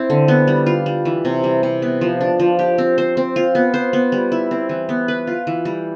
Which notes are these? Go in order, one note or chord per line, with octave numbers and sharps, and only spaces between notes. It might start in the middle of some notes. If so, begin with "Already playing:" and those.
Already playing: C4 E4
D3
B3
G3
F4
G3
E3
C3
G3
C3
B3
F3
D4
F3
G4
C4
C5
C4
F4
B3
C5
B3
G3
E4
C4
E3
B3
B4
F4
E3
G3